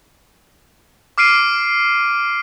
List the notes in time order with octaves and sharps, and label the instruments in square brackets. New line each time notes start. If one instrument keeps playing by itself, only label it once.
[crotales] D6 F6 C7 D7 D#7